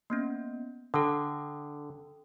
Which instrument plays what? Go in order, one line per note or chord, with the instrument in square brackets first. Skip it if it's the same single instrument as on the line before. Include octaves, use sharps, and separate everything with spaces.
[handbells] A#3 B3 C#4
[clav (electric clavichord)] D3 [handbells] A4 G5 D#6